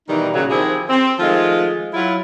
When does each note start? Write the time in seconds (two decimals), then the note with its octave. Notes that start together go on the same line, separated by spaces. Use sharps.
0.09 B2 D#3 E3 G3 D#4
0.34 A#2 C#3 F#3
0.50 D#3 F3 C4 E4 G4 G#4
0.90 C4
1.19 D#3 F3 G#3 A3 F4
1.93 F#3 E4 F4